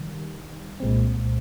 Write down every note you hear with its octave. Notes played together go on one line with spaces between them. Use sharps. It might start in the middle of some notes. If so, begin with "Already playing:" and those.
Already playing: C3 D#3 G3
C2 A#2 G#3 C4